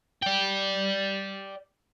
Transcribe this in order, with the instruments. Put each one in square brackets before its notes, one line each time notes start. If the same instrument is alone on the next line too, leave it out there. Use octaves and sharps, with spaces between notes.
[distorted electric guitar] D5 G5